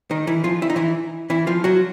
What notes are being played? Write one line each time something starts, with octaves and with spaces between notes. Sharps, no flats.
D#3 D#4
E3 E4
F3 F4
E4
D#4
E3 E4
E3 E4
F3 F4
F#3 F#4